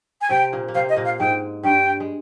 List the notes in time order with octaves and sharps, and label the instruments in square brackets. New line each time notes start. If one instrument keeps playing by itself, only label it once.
[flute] G#5
[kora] C3 C4 [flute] G5
[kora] A#2 A#3
A#3
[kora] C3 C4 [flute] F5
[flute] D#5
[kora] A#2 A#3
[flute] F5
[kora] G#2 G#3 [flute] G5
[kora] G2 G3 [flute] G5
[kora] G#3